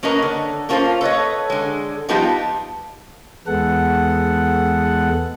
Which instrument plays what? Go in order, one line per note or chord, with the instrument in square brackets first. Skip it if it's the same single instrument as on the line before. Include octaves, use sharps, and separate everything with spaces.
[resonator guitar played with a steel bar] A#3 C#4 A#4 B4 D#5
D3
A#3 C#4 F4 A4 C5 F5
A4 B4 C#5 D#5
D3 G#3
F3 G3 B3 D#4 F4 G4
[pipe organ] E2 G#3 B3 A4 F#5